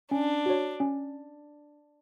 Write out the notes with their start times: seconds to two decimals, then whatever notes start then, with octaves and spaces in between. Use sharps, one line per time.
0.11 C#4 D4
0.46 F#4 C#5
0.80 C#4